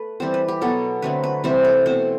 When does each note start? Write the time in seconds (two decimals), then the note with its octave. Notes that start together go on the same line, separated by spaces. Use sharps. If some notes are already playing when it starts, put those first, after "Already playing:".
Already playing: A3 A4 B4
0.20 E3 G3 C4 C5
0.34 B4
0.48 G4
0.61 B2 F#3 B3 A4
1.02 D3 F#3 A3 C4 B4
1.23 B4
1.44 C3 E3 G3 C4 C5
1.65 A4
1.86 B2 A3 C4 C5